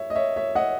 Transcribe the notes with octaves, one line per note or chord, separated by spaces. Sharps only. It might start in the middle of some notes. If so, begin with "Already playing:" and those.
Already playing: C#5 E5
D#5
C#5 E5
C#5 E5
D#5 F#5